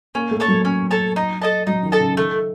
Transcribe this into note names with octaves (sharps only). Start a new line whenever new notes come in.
A#3 C#4
A3
A4 C#5 A5
F#3
C#4
A4 C#5 A5
D#4
A4 D#5 A5
F#3 D#4
D#3
A4 D#5 A5
C#3
D#3 A3